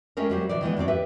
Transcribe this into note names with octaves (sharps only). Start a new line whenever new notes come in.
G#3 A3 C#4 G4 G#4 A#4
F#3 G3 C4
B2 E3 D5
D#3 E3 G#3 B3
G2 F#3 C4 D5
G4 B4 E5